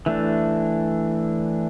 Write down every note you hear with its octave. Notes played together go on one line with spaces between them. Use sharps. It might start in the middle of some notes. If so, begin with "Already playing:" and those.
E3 A3 D4